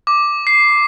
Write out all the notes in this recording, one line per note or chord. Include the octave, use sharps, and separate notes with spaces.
D6
C7